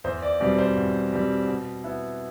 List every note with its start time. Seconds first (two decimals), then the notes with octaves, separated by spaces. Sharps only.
0.04 E2 C5
0.22 D5
0.40 B2 G3 C4 D5
0.58 C5
0.77 E2
1.13 B2 G3 C4
1.48 B2
1.84 B3 E4